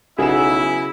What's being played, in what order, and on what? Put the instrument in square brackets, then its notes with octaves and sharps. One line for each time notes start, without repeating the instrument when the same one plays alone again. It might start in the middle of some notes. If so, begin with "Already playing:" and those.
[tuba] B1 [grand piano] C#3 F#3 E7 [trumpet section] E4 E5 [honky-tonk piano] G#4